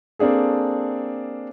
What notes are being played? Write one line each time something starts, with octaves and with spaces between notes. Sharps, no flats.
A#3 C4 D4 G#4 A4